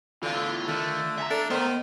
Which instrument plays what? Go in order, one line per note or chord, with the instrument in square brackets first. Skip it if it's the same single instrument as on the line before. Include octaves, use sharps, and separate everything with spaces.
[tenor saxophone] D3 [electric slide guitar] E3 C4 [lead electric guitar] F4 F5
[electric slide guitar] A2 B3 E4
[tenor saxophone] D3 [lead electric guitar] D#3 [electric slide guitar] A3 [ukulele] F4
[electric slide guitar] A3 G#5 A#5 [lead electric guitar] E5
[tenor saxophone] D4 [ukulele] A4
[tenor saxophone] D#3 [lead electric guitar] B3 [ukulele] C5